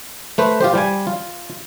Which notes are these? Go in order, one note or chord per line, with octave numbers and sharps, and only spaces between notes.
A3 B4 C5
F4 G4 C5
G3 G#5
F4